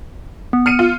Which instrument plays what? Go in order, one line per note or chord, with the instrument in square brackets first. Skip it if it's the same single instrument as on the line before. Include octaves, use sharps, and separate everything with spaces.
[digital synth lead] B3
[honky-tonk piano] F6 C#7 D#7
F4